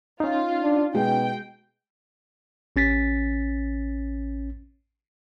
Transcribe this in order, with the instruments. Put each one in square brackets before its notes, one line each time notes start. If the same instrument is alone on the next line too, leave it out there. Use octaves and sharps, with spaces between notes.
[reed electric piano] C#4 D#4 [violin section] F4
[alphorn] D4
[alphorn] B2 [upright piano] G#3 [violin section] G5
[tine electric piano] A1 C#4 A6 B6